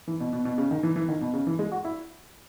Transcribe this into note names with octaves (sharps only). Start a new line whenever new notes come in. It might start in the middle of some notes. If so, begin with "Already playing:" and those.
E3
B2
B2
B2
C#3
D#3
E3
E3
D#3
B2
C#3
E3
G#3
F#4
E4